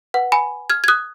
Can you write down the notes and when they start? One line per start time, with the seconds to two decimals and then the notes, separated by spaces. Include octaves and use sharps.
0.14 B4 F#5
0.32 G#5 B5
0.70 F6 G#6
0.84 G#6
0.88 D#6 F#6